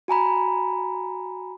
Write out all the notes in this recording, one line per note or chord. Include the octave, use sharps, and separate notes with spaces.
F#4 G#5 A#5 B5